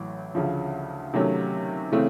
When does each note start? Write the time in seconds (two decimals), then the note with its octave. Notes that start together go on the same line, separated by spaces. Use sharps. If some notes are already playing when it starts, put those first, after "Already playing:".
Already playing: A1 A2 F#3
0.35 D2 C#3 F3
1.14 C3 D#3 F#3 A3 C#4
1.92 C#3 E3 A3 C4